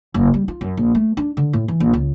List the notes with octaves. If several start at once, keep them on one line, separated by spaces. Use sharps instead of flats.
F#1
G3
F4
F#2
A#1
A3
D4
D3
A2
E3
A#1
C#2